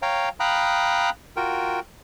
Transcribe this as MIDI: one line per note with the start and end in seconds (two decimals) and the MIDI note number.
0.02 0.29 73
0.02 0.29 77
0.02 0.29 79
0.02 0.29 82
0.40 1.10 77
0.40 1.10 79
0.40 1.10 82
0.40 1.10 83
0.40 1.10 87
0.40 1.10 90
1.37 1.80 65
1.37 1.80 66
1.37 1.80 70
1.37 1.80 79